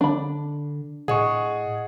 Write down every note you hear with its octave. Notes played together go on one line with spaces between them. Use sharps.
D3 D4 B5
A2 G#4 D#5 F#5 C#6